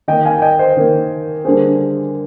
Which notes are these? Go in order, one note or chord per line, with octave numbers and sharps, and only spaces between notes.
D#3 A#3 D#5 G5
F5 G#5
G#5
D#5 G5
C5 D#5
D#3 A#3
D3 G3 A#3 G#4 C5
G#4